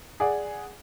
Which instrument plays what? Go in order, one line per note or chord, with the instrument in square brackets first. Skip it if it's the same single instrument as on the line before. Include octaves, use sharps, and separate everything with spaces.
[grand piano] G#4 D5 F#5